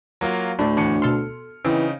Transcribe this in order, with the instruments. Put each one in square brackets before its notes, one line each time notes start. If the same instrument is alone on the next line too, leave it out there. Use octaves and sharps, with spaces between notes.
[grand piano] F#3 A#3 F4
[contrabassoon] D2 [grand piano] A2 [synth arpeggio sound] A3 D4
[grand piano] E2 A2 C#7 [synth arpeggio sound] D4
[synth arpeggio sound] B2 A4 C6 [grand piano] F6
[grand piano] C#3 D#4 [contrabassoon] E3 [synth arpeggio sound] C4